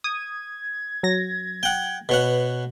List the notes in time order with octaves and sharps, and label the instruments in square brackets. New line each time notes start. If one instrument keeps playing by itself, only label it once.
[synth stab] D#6 [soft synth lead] G#6
[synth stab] F#3 A#6
[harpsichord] F#5 G5
[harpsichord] B2 C#5 F#5 [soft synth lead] B4